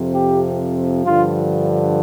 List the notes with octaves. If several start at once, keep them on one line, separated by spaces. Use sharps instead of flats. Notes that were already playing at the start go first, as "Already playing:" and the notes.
Already playing: F2 C3 F3
G4
G2 D3 F3 F4